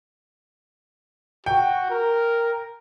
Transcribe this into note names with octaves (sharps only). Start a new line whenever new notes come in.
F#4 G5
A#4